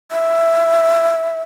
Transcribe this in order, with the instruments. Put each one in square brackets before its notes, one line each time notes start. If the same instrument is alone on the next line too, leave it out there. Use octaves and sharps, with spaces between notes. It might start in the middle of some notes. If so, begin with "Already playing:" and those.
[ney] E5